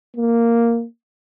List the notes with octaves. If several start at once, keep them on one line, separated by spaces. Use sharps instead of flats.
A#3